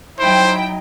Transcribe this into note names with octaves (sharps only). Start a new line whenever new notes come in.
F#3 D#4 E4 C5 G5